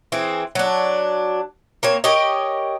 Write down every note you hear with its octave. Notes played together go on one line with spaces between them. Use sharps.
E3 C4 G#4
F#3 D4
A#3 C4 C#5
G4 A#4 C#5 D#5